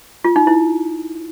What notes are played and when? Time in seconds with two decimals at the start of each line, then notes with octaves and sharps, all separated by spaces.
0.24 F4
0.36 D#4
0.47 E4